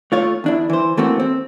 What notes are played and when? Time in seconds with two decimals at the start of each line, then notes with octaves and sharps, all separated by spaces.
0.12 A3 F4 C#5
0.44 E2 D4 E4
0.70 E3 C5
0.97 E3 A3 A#3 C4 F#4
1.20 C4